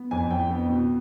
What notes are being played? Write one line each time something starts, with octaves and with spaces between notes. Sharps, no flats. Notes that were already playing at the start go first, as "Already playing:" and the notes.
Already playing: B3
F2 G#5
F2 G5
B3
B2